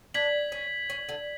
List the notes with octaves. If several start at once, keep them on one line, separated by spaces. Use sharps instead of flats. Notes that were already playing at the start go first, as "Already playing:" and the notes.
D4 G#6 B6 F#7
C#4
C#4
D3